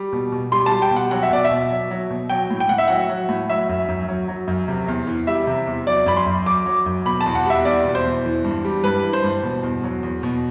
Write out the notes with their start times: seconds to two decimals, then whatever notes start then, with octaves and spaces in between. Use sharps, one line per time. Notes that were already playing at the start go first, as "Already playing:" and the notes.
Already playing: G3
0.13 B2
0.32 B2
0.52 G3 C6
0.66 A5
0.71 G3
0.82 G5
0.91 B2
0.96 F#5
1.11 F#3 F#5
1.23 E5
1.30 B2 D5
1.44 E5
1.51 B2
1.71 F#3
1.91 F#3
2.10 B2
2.30 F#3 G5
2.51 A2
2.60 G5
2.69 A2 F#5
2.78 E5
2.88 F#3 F#5
3.09 F#3
3.29 A2
3.50 F#3 E5
3.69 F#2
3.88 F#2
4.08 F#3
4.28 F#3
4.48 F#2
4.68 C3
4.88 E2
5.07 E3
5.27 G3 E5
5.47 C3
5.67 E2
5.87 F#3 D5
6.06 F#2 B5
6.16 C6
6.26 F#2
6.46 F#3 D6
6.66 F#3
6.86 F#2
7.05 B2 B5
7.21 A5
7.26 E2
7.35 F#5
7.46 G3 E5
7.65 E2 D5
7.84 B2
7.95 C5
8.05 E2
8.25 E3
8.44 G2
8.64 G3
8.84 G2 B4
9.04 E3
9.13 C5
9.24 G2
9.43 B2
9.63 E2
9.84 F#3
10.03 E2
10.23 B2